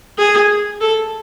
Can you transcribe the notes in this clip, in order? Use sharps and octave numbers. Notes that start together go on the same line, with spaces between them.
G#4
A4